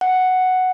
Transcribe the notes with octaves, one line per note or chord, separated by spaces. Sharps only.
F#5